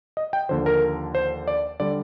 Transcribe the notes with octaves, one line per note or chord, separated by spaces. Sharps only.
D#5
G5
D#2 D3 F3 C5
A#4
C5
D5
D3 G3 D5